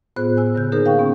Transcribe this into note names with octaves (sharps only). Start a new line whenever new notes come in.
A2 B3 F4 G#4 C5 F#6
G#5 E6 F#6
G2 C#3 G6
D3 A#3 D#4 G#4 A#4 C5
F5 G5 C#6
B3 C#4